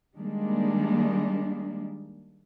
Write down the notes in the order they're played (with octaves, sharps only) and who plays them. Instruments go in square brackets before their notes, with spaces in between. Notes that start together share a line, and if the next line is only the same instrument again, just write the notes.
[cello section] D#3 G3 G#3 A#3 D4